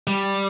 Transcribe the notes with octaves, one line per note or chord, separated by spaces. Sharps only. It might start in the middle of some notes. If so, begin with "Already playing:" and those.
G3